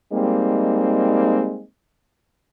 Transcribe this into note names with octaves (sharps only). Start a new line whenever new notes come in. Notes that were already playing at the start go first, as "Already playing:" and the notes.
G3 G#3 A#3 C4 D#4